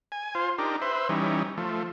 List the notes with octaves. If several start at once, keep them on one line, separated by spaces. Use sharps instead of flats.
G#5
F4 C5
D4 D#4 G4 A#4
B4 C5 E5
E3 G3 C#4 D#4
F3 A3